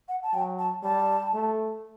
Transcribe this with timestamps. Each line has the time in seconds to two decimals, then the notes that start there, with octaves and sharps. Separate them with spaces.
0.09 F#5
0.23 A5
0.34 F#3 G5
0.59 A5
0.83 G3 A5
1.34 A3